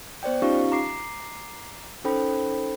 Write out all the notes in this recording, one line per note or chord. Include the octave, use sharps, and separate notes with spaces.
B3 C5 D5 G5
C#4 D#4 F4 G4 F5 C#6
A#5 D6 C7
C#4 D#4 A4 C5 G5 B5